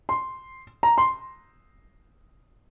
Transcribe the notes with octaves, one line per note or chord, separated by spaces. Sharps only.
C6
A#5
C6